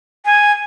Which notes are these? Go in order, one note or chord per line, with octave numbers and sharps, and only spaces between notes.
G#5